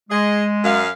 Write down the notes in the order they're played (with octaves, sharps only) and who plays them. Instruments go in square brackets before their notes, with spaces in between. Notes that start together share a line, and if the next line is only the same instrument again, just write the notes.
[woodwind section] G#3 [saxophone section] G#4 D#5
[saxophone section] F#2 F5